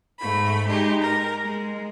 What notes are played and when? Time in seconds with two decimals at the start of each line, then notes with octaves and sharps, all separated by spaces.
0.20 G#2 A3 B5
0.68 G#3 D#4 G4
1.01 A#4
1.43 G#3